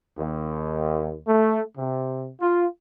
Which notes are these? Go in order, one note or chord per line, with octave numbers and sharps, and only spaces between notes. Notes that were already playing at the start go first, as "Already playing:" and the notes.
D#2
A3
C3
F4